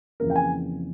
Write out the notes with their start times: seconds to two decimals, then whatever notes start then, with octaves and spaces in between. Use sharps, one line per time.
0.20 F2 C#3 E3 A#3 C#4 A#4
0.30 G5
0.36 G#5